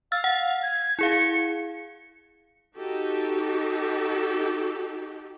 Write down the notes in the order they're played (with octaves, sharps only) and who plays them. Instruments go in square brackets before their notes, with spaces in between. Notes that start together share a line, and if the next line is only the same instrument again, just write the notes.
[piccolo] F5 [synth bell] E6 F6 A6
[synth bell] F#5
[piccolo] G#6
[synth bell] E4 G#4 F5 [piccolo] C#7
[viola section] D#4 F#4 G4 A4